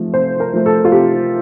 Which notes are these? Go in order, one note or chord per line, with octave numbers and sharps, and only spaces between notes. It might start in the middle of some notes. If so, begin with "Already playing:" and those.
Already playing: C3 F3 A3
C3 C5
A#4
F3 A3
A4
F4
C3 G4